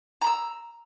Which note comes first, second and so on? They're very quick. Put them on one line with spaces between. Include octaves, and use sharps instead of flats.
A#5 B5 E6